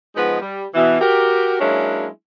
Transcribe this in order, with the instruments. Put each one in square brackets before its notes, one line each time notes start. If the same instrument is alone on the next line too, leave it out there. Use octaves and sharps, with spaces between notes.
[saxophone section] F3 G#3 B3 D#4 B4 F#5
G3
B2 E3
F#4 G4 A#4
F#3 G#3 A#3 C#4 D4 E4